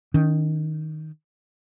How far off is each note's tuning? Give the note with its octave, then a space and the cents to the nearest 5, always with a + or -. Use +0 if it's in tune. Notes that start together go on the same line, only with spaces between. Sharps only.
D#3 +0 C#4 +40